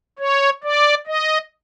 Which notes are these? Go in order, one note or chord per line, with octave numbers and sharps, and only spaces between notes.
C#5
D5
D#5